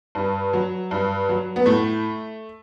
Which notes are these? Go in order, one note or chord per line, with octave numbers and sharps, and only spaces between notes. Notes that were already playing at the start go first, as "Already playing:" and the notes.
G2
F#3
G2
F#3
B3
A2 A3